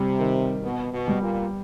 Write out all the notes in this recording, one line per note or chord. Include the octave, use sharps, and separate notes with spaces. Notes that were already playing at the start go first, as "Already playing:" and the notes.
Already playing: C3 G3 C4
D#3
B2 B3
B2
G3
A#2